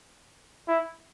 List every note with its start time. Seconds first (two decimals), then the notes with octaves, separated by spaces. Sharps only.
0.68 E4